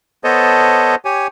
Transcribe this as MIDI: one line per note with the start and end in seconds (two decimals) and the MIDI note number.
0.24 0.95 59
0.24 0.95 69
0.24 0.95 72
0.24 0.95 73
0.24 0.95 75
0.24 0.95 81
1.05 1.27 67
1.05 1.27 73
1.05 1.27 80